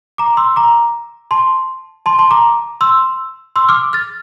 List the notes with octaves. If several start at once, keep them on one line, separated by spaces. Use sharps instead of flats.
A#5 D6
C6 E6
A#5 D6
A5 C6
A5 C6
A5 C6
A#5 D6
C6 E6
C6 E6
D6 F6
F6 A6